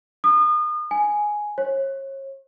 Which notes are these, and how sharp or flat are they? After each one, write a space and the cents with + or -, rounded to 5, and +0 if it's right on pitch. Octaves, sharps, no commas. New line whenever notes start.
D#6 -35
G#5 +5
C#5 -35